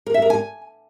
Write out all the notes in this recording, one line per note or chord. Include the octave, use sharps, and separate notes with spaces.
A#4
E5
A#4
G#5